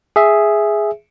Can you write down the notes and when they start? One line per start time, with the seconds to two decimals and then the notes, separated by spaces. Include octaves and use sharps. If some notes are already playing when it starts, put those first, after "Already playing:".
0.16 G#4 E5